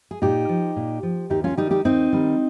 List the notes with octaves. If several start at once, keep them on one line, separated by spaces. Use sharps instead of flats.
G#4
A#2 D#4 G4
F3
A#2
F3
D#2 D#4 G4
C#4 F4
D#3 G3 D#4 G4
D#4 G4
D#2 C4 D#4
D#3 G3